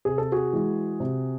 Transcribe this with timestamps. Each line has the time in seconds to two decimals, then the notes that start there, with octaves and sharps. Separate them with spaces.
0.05 C3 G#4
0.18 A4
0.32 F#4 G#4
0.53 E3 G#3
1.00 C3